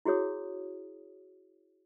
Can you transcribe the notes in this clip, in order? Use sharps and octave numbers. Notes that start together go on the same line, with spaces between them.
E4 F#4 G#4 C#5 D#6